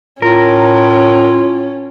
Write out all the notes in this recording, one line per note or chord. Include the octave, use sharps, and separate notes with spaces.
A2 C#4 F4 A#4